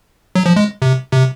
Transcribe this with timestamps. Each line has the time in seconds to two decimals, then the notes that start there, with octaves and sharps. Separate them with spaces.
0.35 F#3
0.46 F3
0.56 G#3
0.82 C3
1.13 C3